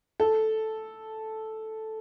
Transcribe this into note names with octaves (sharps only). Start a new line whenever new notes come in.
A4